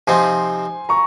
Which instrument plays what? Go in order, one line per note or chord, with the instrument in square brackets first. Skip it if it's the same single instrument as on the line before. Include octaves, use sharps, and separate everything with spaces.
[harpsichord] C3 F3 C4 D#4 [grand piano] G#5 C6
[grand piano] A#5 C#6